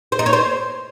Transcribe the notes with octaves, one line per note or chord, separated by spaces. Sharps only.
C5
D#4
C#5
C5